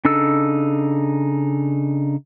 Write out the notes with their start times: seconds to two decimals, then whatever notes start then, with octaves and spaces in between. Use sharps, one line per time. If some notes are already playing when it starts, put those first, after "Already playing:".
0.05 C#3 D4 D#4 A4 E6